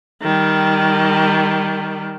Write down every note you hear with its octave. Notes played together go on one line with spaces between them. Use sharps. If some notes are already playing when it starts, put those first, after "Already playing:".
D#3 G3